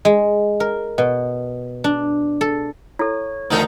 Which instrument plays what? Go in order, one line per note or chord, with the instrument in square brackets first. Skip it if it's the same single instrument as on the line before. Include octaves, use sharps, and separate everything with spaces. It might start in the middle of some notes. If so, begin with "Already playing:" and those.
[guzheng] G#3
A#4
B2
D4
A4
[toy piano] E4 A4 [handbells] C#5
[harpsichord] D2 D#3 G5 [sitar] E3 D#4 A4 [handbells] A#5